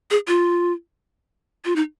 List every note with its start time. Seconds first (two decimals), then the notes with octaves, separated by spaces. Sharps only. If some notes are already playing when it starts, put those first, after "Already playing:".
0.11 G#4
0.28 F4
1.65 F4
1.76 D#4